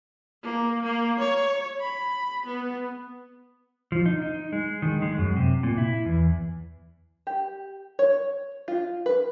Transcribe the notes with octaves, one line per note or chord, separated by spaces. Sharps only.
A#3
A#3
C#5
B5
B3
F3
D#4
D#4
G#3
D#3
G#3
F#2
C3
A#2
E4
E2
G4
C#5
F4
B4